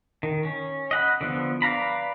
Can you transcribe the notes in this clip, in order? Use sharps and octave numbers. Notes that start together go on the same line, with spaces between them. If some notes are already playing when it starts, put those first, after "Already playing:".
D#3
C#4
D#5 F#5 B5
D3 F3 B3
B4 D5 F5 A#5 B5